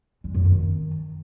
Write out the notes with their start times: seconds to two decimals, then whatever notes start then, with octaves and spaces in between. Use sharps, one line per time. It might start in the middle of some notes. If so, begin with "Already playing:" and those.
0.24 G#3
0.34 F#2
0.45 D#3